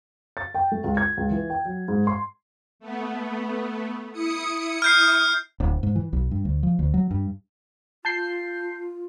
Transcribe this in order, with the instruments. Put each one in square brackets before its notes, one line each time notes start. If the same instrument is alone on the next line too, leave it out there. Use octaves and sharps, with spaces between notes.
[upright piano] A6
G5
A3
C#2
G#6
C#2
E3
G5
F#3
G#2
C6
[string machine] A3 B3
E4 D#6 C#7
[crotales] F6 G6 C7
[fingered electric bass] D1
G#2
E3
B1
G2
D2
F3
D2
F#3
G2
[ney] F4 [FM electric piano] A5 G6 C7